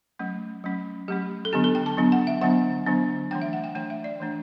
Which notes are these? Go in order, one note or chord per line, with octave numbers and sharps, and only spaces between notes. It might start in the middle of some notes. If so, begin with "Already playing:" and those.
F#3 A3 C#4
F#3 A3 C#4
F#3 A3 C#4 G4
A4
D3 F#3 B3 D4 G4
A4
G5
A5
D3 F#3 B3 D4
F#5
E5
D3 F#3 B3 D4 F#5
D3 F#3 B3 D4
E3 A3 D4 G5
E5
F#5
G5
E3 A3 D4 G5
E5
D5
E3 A3 D4